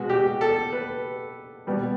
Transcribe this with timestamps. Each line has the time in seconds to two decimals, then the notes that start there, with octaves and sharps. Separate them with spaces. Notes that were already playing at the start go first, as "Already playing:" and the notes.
Already playing: B2 G#3 B3 F#4
0.09 G4
0.41 A4
0.72 B4
1.67 B2 G3 B3